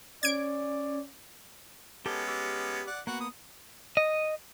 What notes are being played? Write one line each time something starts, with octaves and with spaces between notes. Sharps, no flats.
C#4 D5 G#6 D7
G#3 B3 C#4 G4 A4
G4 D6 E6
D5 F#5
A#3 B3 F#4 F#5
D#6
D#5